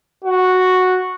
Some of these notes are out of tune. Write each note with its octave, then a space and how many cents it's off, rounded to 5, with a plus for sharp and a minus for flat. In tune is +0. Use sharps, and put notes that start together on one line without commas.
F#4 -5